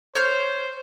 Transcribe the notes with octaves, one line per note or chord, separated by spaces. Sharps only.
C5 C#5 F6 G6